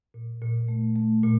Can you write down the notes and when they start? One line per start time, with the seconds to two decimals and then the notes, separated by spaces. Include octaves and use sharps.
0.14 A#2
0.42 A#2
0.68 A3
0.96 A3
1.24 A#2